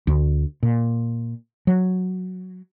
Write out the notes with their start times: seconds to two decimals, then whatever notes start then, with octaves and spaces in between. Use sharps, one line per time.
0.07 D2
0.63 A#2
1.67 F#3